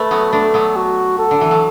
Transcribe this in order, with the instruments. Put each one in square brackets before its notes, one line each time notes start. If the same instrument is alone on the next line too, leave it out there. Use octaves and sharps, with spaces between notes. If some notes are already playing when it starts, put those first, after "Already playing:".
Already playing: [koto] A3 [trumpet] B4
[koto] F#3 B3
[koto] A3 D4 [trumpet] A4
[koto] F#3 B3
[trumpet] F#4
A4
[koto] D3
E3
F#3